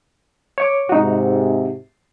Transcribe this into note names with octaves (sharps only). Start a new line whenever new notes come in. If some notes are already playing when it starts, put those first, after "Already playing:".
C#5 C#6 D6
G#2 C3 D#4 F#4